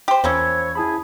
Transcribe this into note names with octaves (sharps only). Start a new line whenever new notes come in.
G4 C5
E2 F3 A#3 C#4 C5 C#5 B5 E6
E4 G#4 A5 B5